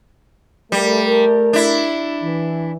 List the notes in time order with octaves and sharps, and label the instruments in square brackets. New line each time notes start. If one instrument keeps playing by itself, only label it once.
[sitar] G3 [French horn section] A3 A#4
[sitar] D4 E4
[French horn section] E3